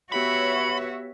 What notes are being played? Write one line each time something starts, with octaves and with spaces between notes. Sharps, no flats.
B3 F#4 G4 B4 C#5 E5 B5 B6